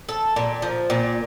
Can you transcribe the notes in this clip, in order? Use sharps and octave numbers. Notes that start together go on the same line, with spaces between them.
A4
A#2
F3
A#2